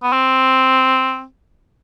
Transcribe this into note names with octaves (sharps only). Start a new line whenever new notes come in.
B3
C4